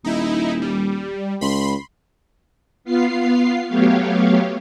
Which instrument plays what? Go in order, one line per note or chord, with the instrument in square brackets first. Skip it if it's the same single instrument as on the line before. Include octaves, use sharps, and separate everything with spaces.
[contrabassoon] D#1 [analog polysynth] D#4 E4
[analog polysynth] G3
[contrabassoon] C#2 [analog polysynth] B5 C6
[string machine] B3 F4 F5 C7
F#3 A3 B3 G4 C#5 F5